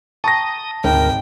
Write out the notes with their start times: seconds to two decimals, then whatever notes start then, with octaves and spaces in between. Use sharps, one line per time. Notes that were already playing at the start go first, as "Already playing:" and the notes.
0.24 G5 A5 A#5 C#6 D#6 A#6
0.84 G#1 D2 C3 A#4 G5